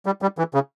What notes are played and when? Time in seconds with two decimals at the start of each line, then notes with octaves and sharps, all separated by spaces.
0.06 G3
0.22 G3
0.38 E3
0.54 C#3